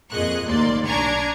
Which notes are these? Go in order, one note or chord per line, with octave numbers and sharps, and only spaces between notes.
F2 A#2 G#4 D#5 C#6 F#6
D#2 A2 A#3 D5 C6
B1 D4 G#5 A#5 C#6 G#6